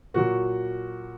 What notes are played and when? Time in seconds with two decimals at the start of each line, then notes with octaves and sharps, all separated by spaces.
0.14 A#2 F#3 F#4